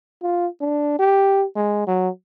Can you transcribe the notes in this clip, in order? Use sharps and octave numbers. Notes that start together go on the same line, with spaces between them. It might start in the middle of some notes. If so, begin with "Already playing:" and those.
F4
D4
G4
G#3
F#3